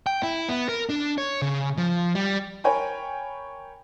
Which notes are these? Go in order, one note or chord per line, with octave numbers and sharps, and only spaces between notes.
G5
E4
B3
A#4
D4
C#5
C#3
F3
G3
A#4 C#5 G5 G#5 B5